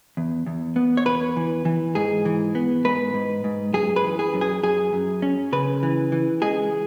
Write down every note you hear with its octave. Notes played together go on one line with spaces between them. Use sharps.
E2
E2
B3
C#5
E2 B4
E3
E3
G#2 G#4
E3
B3
G#2 B4
G#2
G#2
F#2 G#4
B4
E3
G#4
F#2
G#4
F#2 G#4
F#2
C#4
C#3 B4
E3
E3
G#3 G#4